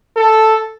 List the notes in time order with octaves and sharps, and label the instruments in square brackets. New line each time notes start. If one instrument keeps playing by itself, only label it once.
[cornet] A4